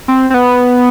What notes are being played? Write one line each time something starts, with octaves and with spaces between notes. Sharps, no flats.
C4
C4
B3